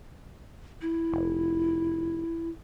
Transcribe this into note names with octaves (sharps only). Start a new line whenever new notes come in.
E4
F1